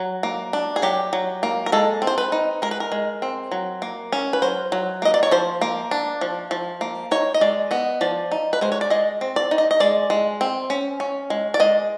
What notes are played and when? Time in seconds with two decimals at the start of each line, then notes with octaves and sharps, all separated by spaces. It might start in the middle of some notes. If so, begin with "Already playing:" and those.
Already playing: F#3
0.23 A#3
0.53 D4
0.76 G#4
0.82 F#3 G4
1.13 F#3
1.43 A#3
1.66 A#4
1.72 G#3 A4
2.02 C4
2.07 C5
2.18 B4
2.32 D#4
2.62 G#3 A#4
2.71 B4
2.80 A#4
2.92 G#3
3.22 C4
3.51 F#3
3.82 A#3
4.12 C#4
4.33 B4
4.42 F#3 C5
4.72 F#3
5.02 A#3 D#5
5.14 D5
5.23 C#5
5.31 F3 C5
5.61 A#3
5.91 D4
6.21 F3
6.51 F3
6.81 A#3
7.11 D#4 C#5
7.34 D#5
7.41 G#3 D5
7.71 B3 D#5
8.01 F3 D5
8.31 D#4
8.53 B4
8.61 G#3 C5
8.72 C#5
8.81 D5
8.90 G#3 D#5
9.21 C4
9.36 D5
9.51 D#4
9.58 D#5
9.71 D#5
9.80 G#3 D5
10.10 G#3
10.41 C4
10.70 C#4
11.00 C#4
11.30 G#3
11.54 D5
11.60 G#3 D#5